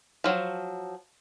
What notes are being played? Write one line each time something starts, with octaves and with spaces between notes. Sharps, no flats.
F3 F#3